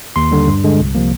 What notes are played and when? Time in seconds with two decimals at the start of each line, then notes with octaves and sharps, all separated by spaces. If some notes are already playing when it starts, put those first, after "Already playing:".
0.16 D#2 C6
0.31 D3 G3
0.48 G2
0.64 D3 G#3
0.80 C2
0.95 C3 F3 A#3